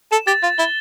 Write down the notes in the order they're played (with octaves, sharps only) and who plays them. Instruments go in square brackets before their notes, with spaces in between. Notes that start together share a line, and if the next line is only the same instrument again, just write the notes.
[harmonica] A4 [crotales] E7
[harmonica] G4 [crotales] A6
[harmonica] F4 [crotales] A6
[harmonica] E4 [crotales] G7